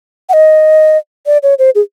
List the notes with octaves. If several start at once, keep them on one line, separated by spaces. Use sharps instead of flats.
F#5
D#5
D5
C#5
C5
G#4